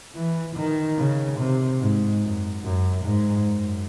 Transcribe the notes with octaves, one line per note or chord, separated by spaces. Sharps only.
E3
D#3
C#3
C3
G#2
F#2
F#2
G#2
F#2